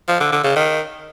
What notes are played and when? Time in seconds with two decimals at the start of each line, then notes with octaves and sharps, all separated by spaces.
0.08 F3
0.20 D3
0.32 D3
0.44 C#3
0.55 D#3